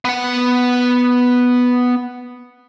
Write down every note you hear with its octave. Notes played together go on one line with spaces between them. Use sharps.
B3 F#5